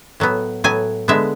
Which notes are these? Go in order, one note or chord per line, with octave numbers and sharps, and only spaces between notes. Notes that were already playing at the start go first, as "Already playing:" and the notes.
A2 F#3 B3
A2 F#3 B3 G#5
D3 G#3 B3 E5